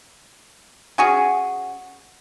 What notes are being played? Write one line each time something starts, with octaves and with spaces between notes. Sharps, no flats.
C#4 F#4 G#4